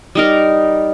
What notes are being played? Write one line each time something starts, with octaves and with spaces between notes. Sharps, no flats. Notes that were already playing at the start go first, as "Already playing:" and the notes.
G3 D#4 A#4